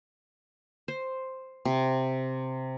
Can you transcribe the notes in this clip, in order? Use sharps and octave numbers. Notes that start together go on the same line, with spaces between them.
C5
C3